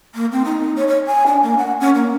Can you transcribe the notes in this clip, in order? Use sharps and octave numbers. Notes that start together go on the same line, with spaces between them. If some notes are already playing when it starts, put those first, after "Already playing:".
A#3
C4
D#4
C#5
C#5
G#5
D4
A#3
F#5
C#4
A#3